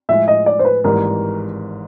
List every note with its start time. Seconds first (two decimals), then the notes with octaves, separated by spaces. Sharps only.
0.09 A2 F3 G#3 E5
0.28 D#5
0.46 D5
0.59 C5
0.65 B4
0.84 G#1 G#2 E3 G3 A#3 A#4